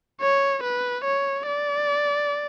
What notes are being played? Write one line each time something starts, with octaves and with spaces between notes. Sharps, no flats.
C#5
B4
C#5
D5